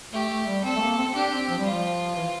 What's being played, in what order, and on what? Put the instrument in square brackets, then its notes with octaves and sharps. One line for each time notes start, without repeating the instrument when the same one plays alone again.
[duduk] A3 [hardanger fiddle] G4
[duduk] A3
G3
[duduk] C4 [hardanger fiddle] A4
[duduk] A3
A#3
C4
C4
[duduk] D4 [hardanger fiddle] G4
[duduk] C4
F3
G3
[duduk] F3 [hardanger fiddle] F4
[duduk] E3